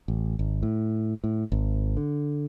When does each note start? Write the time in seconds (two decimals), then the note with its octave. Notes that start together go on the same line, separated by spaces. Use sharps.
0.08 A1
0.39 G#1
0.63 A2
1.24 A2
1.52 G#1
1.97 D3